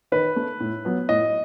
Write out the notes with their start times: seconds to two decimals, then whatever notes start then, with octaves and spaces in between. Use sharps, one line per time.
0.12 D#3 B4
0.36 A3
0.60 A2
0.85 F#3 B3
1.09 A2 D#5